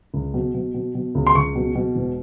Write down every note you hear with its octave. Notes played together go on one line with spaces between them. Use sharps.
C#2
B2
B2
B2
B2
C#2
C6
C#2 C#6
B2
B2
E1